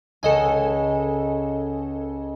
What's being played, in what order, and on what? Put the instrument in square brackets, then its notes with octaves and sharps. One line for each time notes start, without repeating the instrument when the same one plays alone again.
[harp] C#2 [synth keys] A4 D#5 G#5